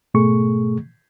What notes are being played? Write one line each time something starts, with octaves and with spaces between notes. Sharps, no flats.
G#2 B2 A3 G#4 C#6